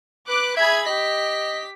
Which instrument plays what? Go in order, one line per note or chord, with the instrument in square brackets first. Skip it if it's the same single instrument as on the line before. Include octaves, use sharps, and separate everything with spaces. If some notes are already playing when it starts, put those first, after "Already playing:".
[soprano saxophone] B4 [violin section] D6 F#6
[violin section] G#4 B5 G#6 [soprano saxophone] E5
[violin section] G4 B6 [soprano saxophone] D#5